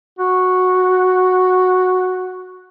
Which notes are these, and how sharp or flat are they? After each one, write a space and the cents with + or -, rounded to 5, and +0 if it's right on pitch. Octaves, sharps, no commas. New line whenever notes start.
F#4 -5